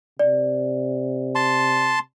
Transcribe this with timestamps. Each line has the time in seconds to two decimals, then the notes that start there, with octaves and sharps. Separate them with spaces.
0.19 C3 D5
1.35 A5 C6